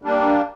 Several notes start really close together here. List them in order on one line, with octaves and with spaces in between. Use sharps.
G3 D4 A#3